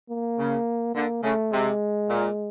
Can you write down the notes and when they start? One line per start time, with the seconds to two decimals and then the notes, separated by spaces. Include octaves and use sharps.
0.09 A#3
0.38 C#3
0.95 D3 A#3
1.23 C#3 A3
1.52 C3 G#3
2.08 A#2